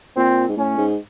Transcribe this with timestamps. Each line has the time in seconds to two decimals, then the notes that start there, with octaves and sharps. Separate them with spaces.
0.16 A#2 C4
0.49 G#2
0.57 A2 C#4
0.78 G#2